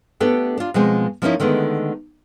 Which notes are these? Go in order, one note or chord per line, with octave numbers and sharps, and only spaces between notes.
A3 B3 D4 G4 A4
D4 F4
B2 F3 G#3 C4
F3 A#3 B3 C#4 D#4 E4
D3 D#3 G#3 A3 B3